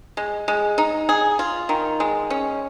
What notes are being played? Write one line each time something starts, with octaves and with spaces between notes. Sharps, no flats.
G#3
G#3
D#4
G#4
F4
D#3
G#3
C#4